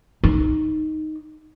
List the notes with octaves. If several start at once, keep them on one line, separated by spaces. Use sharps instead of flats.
D#4